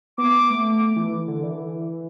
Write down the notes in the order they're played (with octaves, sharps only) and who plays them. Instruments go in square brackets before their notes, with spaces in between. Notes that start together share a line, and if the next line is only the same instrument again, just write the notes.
[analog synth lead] B3 [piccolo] D6
[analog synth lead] A3
E3
D3
E3